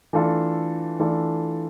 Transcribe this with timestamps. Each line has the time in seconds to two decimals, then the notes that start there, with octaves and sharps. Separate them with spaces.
0.13 E3 A3 D4 F4 A4
0.99 E3 A3 D4 F4 A4